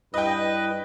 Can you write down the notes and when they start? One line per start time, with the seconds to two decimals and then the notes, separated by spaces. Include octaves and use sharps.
0.14 G2 E4 B4 D#5 G5